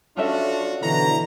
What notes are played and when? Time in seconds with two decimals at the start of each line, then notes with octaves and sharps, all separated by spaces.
0.17 C#4 D4 F4 F#4 A4 E5
0.82 B2 D3 E3 A#5